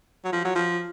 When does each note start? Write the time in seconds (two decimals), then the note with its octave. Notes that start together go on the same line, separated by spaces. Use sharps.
0.25 F#3
0.33 F3
0.45 F#3
0.55 F3